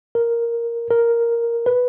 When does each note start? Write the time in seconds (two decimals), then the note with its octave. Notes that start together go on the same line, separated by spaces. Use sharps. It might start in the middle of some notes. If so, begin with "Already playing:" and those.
0.15 A#4
0.91 A#4
1.66 B4